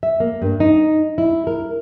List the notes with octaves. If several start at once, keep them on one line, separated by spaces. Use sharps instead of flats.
E5
A#3
G2
D#4
E4
A#4